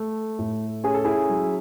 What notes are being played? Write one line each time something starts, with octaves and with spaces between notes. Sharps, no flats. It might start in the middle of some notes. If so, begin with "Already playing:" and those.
Already playing: A3
A2
C#4 G#4
A4
E4 G#4
F#3